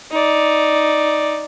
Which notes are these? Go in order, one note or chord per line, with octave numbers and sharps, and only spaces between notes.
D#4 D5